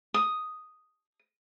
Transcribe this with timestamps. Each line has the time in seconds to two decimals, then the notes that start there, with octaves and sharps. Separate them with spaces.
0.14 D#6